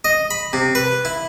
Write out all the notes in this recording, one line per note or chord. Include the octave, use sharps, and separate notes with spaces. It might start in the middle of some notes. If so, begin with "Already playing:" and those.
D#5
B5
C3
B4
E4